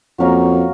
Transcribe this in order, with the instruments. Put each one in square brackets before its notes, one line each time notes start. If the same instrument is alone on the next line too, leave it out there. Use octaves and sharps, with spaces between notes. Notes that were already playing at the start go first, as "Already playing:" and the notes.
[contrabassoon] F2 [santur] F#3 A#3 C#4 F#4